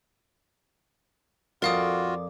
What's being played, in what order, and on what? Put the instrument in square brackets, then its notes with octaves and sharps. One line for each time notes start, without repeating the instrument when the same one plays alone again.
[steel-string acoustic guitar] F2 D5 [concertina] F4 F#4 [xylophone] A#4 F5 D#6